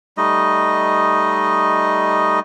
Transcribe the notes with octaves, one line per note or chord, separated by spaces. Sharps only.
G3 A3 D#4 D#5